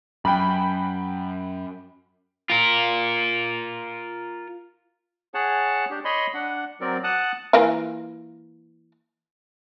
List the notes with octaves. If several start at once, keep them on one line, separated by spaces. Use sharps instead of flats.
F#2 G5 B5
F4 A#4
G#4 C#5 F#5 A5
D4 G4
C#5 D#5 B5 C6
D4 F#5
F#3 C4 A#4 D5
F#5 A5 D#6 F#6
E3 A#3 F4